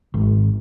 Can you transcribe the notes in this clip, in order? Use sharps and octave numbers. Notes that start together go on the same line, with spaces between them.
G#1